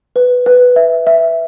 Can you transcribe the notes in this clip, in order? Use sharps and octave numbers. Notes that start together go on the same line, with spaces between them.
B4
B4
E5
E5